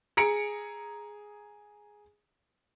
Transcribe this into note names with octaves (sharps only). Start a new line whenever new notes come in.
G#4 A#5 C#7 D7